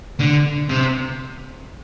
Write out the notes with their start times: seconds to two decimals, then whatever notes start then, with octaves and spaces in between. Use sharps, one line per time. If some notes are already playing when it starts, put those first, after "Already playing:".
0.20 D3
0.70 C3